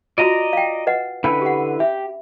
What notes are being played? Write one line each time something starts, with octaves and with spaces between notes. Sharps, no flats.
F4 F#4 D5 D#5 A#5
F5 G5
B4 D#5 F#5
D3 C#4 D4 E4 B4 B5
G4 F#5
G4 E5